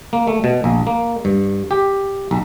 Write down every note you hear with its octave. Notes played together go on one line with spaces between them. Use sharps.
A#3
A3
B2
A#1
A#3
G2
G4
B1